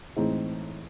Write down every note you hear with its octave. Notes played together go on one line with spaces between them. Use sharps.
A2 E3 G#3 C4 D#4